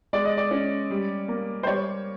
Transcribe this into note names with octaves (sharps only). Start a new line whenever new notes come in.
G#3 D5
D#5
D5
C#4
G3
A#3
C5
G3 C#5